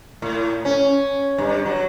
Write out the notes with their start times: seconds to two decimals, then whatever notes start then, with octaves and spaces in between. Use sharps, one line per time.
0.22 A2
0.65 C#4
1.38 G2
1.66 F#3